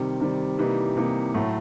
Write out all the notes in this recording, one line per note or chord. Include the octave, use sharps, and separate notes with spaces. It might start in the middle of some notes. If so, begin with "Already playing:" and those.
Already playing: C3 D#3 G3 C4
C3 D#3 G3 C4
C3 E3 G3 A#3 D#4
C3 E3 G3 A#3 D#4
A2 F#3 A3